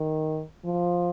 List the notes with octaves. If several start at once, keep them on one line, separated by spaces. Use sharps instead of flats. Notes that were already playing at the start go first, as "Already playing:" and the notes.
Already playing: D#3
F3